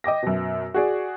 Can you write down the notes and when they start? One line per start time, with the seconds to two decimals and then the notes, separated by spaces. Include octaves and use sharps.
0.04 D#5 G5 D6 A#6
0.23 F#2 B2
0.74 F#4 G#4 D5